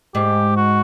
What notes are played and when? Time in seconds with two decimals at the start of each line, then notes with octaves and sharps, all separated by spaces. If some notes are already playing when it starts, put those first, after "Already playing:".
0.15 G#2 G4
0.57 F#4